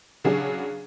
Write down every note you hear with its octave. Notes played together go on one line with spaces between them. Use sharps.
C#3 F#3 D4 G#4